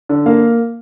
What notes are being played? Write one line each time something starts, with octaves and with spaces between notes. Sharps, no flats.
D3
A#3 F5